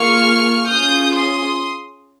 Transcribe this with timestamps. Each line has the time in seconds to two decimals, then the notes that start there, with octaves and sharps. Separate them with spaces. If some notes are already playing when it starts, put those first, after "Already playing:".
Already playing: A#3 F4 G#4 C#6 F6
0.68 C#4 F4 G#4 D#6 G6
1.16 C6 D#6